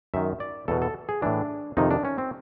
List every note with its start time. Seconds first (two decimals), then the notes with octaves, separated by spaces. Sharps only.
0.14 F#2 D#3 E5
0.40 D5
0.68 E2 B2 A4
0.82 A4
1.09 G#4
1.22 A2 E3 D4
1.77 F2 C3 D#3 D#4
1.91 D4
2.05 C#4
2.18 C4